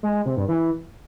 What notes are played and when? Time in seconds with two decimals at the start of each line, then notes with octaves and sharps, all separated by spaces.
0.03 G#3
0.14 G#3
0.26 C3
0.37 G2
0.49 E3